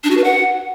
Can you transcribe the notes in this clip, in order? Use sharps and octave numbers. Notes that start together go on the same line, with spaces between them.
D4
F#4
B4
F#5